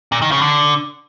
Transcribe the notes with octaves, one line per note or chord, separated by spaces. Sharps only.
A#2
D#3
C#3
D3